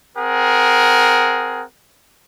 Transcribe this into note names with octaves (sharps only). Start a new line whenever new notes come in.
C4 G#4 A#4 F#5